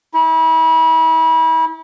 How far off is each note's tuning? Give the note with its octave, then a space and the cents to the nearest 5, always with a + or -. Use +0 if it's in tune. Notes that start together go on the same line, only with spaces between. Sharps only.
E4 -35